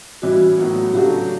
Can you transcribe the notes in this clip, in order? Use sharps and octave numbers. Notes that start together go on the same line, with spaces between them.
E3 G3 C#4 E4 F#4
A2 F#3 B3
C#3 F#3 A3 D4 F#4 G4